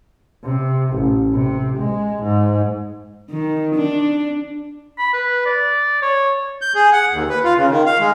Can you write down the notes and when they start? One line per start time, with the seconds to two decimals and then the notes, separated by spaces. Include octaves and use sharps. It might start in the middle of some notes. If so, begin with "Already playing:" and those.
0.44 C3
0.93 A1
1.33 C3
1.78 G#3
2.23 G#2
3.30 D#3
3.75 D4
4.99 B5
5.13 B4
5.46 D5
6.02 C#5
6.61 G6
6.75 G#4
6.93 F#5
7.12 D#2
7.29 B4
7.44 F4
7.57 C#3
7.70 D#3
7.86 F5
7.99 G#3